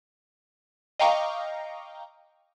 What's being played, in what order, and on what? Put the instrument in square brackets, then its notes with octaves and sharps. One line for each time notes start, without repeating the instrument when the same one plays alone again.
[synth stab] D#5 F5 G5 A#5 C#6 D6